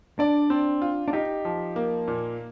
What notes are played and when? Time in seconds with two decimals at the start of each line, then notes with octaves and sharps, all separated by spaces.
0.19 D4 D5
0.50 C4
0.82 F4
1.08 D4
1.13 D#4 G4
1.45 F3
1.76 A#3
2.08 A#2